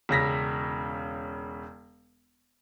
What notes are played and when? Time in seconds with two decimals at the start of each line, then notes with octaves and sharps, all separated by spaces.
0.09 E1 C#3 A#6 B6